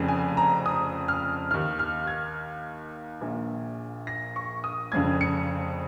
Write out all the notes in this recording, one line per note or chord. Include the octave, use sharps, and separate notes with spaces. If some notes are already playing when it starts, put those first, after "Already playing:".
Already playing: F1 F2 C#3
G#5
A#5
D#6
F6
D#2 D#3 F6
F6
G#6
A#1 A#2
A#6
C#6
D#6
F1 F2 C#3 G#6
C#7